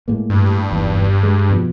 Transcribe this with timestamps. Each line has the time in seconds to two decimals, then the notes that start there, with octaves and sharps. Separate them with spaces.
0.08 A2 G#3 A#3
0.30 G2
0.70 F#1 B1 E2
1.23 G#3
1.50 F2 B2 F3